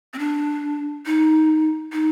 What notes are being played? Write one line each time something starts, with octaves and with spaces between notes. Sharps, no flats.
C4
D4
D#4
D#4